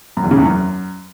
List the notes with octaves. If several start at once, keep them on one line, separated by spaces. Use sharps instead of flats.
F#2
E2
C#3
E2
F#2